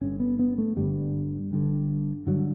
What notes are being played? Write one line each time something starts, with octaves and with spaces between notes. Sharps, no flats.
G1 G2 D3 C#4
B3
B3
A3
G1 G2 D3 G3
G1 G2 D3
G2 D3 F#3